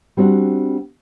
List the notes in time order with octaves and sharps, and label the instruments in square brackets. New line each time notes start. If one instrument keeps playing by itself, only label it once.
[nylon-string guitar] G3 C4 D4 F#4